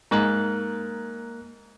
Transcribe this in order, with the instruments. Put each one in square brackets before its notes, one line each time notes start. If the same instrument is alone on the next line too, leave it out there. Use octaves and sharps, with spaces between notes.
[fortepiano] G#2 [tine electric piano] A#3 A#4 F#6